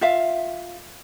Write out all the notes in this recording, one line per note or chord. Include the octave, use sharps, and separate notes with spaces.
F4 E5 F5